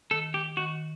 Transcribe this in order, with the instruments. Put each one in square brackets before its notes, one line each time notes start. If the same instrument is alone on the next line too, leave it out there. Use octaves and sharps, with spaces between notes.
[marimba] D#3 [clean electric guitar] A4
[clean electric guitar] G4
[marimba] D#3 [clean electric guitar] F#4